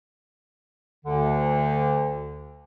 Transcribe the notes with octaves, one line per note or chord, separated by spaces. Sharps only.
D2 D3